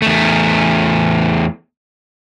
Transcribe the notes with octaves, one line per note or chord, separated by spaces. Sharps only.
E2 A3